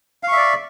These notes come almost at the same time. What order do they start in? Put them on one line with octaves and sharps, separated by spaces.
F5 C#6 E5 D5